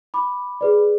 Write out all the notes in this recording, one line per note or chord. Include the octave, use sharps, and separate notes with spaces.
B5 D6
G#4 B4 D5